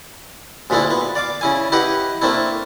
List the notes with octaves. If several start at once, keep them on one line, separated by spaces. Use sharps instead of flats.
D2 A#2 G#3 D4 E4
B3
D5 F5 D6
C#3 E4 G#5
E4 G4 B4 D#5 F#5
A3 A#3 C4 D4 E4